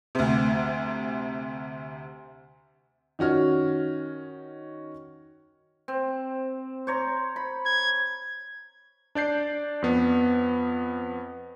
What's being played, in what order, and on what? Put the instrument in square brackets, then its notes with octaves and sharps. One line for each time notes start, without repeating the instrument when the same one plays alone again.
[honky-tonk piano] D2 C3
[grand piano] D#3 C#4 F#4 F6
[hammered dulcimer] C4
C5 C#5 A#5
B5
[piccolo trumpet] G#6
[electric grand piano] D4 D5 G6 C7
F2 B3